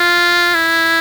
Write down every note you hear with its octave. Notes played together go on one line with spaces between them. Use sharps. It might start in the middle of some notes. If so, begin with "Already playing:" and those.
Already playing: F4
E4